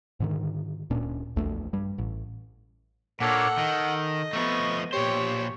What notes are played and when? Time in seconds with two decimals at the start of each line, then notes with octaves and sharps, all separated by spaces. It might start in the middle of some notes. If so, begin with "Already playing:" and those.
0.20 G#2 D3 D#3
0.90 D1 A#2 C#4 D4
1.36 A#1 E2 A3 D4
1.73 G2 G3
1.98 A1
3.20 A#2 A#3 D4 A4 C#5 F#5
3.58 D#3 D#5
4.33 F3 A3 B3 C#6
4.93 A#2 G4 C5 C#5